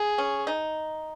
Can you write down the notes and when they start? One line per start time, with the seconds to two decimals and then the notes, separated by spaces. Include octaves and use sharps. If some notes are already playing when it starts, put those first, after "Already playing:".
Already playing: G#4
0.18 C#4
0.47 D#4